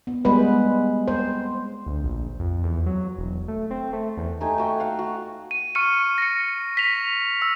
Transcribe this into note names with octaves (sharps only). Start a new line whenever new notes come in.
B3
G3 G#3 B3 B4 C5
C5
D2
A#1
F2
E2
F#3
E1
A3
C4
A3
E2
A3 D#4 G4 G#5
A3 F#4 G5
F5 F#5
F#4
D#7
C#6 F6 C#7 D#7
A#6 C#7
B6 F7
E6